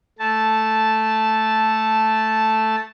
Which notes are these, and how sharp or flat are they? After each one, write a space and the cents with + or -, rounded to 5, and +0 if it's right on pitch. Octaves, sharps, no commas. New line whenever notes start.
A3 +0 A5 -5